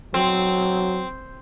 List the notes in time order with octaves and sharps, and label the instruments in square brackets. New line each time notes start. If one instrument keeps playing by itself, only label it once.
[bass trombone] F#3 [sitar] C4